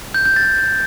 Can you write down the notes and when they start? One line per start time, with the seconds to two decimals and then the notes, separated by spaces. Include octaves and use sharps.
0.14 G6
0.25 G6
0.36 A6